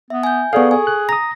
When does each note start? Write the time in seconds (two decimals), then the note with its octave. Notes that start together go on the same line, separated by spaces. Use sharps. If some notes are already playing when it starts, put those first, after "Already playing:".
0.10 B3 E5
0.23 G#5 G6
0.53 B3 G#4 A4 D5 F5 C#6
0.71 G#4 G#5
0.87 F#6
1.09 A#5 D#6 A#6